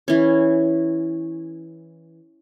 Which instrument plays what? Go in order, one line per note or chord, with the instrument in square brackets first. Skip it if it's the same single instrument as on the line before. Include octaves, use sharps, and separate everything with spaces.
[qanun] E3 C#4